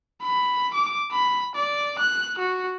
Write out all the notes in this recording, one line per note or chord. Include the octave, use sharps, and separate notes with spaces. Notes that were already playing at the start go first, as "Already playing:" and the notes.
B5
D6
B5
D5
F#6
F#4